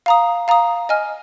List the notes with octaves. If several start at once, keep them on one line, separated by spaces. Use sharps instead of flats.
F5 A#5 D#6
F5 A#5 D#6
D#5 G#5 F6